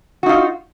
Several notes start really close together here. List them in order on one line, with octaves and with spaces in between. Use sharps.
F#4 D#4 F4